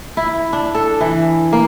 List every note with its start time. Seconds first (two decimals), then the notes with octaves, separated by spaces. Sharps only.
0.17 E4
0.53 D4
0.75 A4
1.01 E3
1.53 A#3